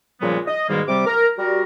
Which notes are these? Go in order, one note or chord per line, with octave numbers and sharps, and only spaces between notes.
A#2 C#3 F3 G3 G#3 B3
D#5
G#2 B2 D#3 G3 G#3 A#3
C3 G3 D6
A#4
G3 F#4 A#4